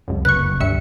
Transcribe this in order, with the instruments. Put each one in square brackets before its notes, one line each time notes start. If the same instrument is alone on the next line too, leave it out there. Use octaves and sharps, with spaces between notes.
[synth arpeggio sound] C#2 F#2
[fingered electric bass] F1 C#3 F#3 [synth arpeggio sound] B4 C#6 [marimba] F#6
[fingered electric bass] D2 [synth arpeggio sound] G2 E5 C#7